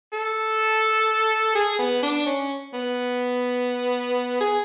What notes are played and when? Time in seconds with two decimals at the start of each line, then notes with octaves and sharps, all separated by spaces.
0.12 A4
1.55 G#4
1.79 B3
2.03 D4
2.26 C#4
2.73 B3
4.40 G#4